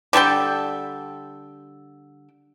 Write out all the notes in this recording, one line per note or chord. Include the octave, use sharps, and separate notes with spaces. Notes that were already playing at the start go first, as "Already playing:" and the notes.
D3 G3 A4 G5